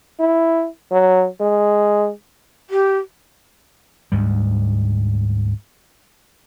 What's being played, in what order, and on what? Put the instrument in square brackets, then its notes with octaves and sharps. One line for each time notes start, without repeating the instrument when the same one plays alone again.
[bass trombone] E4
F#3
G#3
[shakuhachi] G4
[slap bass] D2 G#2 G3